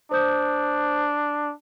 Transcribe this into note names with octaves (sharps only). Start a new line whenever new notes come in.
D4 C5 D#6 G6